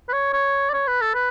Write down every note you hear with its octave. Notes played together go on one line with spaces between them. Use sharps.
B4
C#5
C#5
D5
C#5
B4
A4
B4